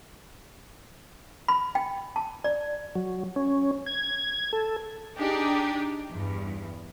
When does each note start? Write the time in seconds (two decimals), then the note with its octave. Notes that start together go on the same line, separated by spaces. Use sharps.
1.48 B5
1.75 G5
2.16 A5
2.44 D5
2.95 F#3
3.36 C#4
3.86 G#6
4.53 A4
5.18 D4 D#4 G4 G#4
6.09 E2 G2